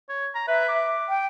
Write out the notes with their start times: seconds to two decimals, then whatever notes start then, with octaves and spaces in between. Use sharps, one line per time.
0.09 C#5
0.35 A#5
0.48 B4 E5
0.68 D6
1.09 G5